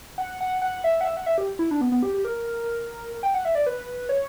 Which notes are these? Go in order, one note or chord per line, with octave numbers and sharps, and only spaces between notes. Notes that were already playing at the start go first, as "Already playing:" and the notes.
F#5
F#5
F#5
E5
F#5
E5
F#5
E5
G4
E4
D4
B3
B3
G4
G4
A#4
G5
F#5
E5
D5
B4
C#5